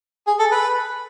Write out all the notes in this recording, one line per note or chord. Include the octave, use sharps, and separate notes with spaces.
G#4
A4
B4